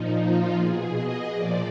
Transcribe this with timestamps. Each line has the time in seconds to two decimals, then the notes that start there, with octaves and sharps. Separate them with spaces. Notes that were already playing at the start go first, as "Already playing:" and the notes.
Already playing: A#2 F3 D#4
0.20 F4
0.57 B2 G#4
0.95 D#5
1.32 A#2 F3 D5